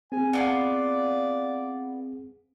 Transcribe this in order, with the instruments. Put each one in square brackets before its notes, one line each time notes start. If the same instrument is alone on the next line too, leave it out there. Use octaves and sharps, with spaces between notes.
[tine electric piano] C4 G#4 [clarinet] G#5
[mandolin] B3 D4 F4 [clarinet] D5